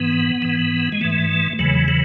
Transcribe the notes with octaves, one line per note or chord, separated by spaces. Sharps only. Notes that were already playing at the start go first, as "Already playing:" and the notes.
Already playing: G#2 E3 B3
G#2 E3
G#3
G#2 E3 A3
E2 C#3 E3 F#3
F#3